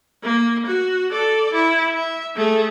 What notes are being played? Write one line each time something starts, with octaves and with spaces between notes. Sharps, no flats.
A#3
F#4
A4 D5
E4
E5
A3 G#4